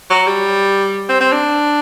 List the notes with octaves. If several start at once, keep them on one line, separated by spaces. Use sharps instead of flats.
F#3
G3
C4
C4
D4